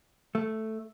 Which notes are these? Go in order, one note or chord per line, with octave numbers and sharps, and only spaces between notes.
A3